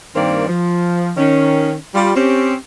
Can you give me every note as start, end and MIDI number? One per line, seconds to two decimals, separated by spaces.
0.15 0.47 43
0.15 0.47 51
0.15 0.47 58
0.15 0.47 60
0.15 0.47 70
0.15 0.47 74
0.48 1.10 53
1.17 1.73 51
1.17 1.73 61
1.94 2.14 55
1.94 2.14 65
2.15 2.53 60
2.15 2.53 61
2.15 2.53 67